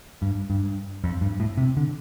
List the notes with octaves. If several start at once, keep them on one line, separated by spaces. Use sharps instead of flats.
G2
G2
F2
G2
A2
C3
D3